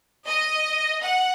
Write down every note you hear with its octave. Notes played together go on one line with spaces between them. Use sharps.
D#5
F#5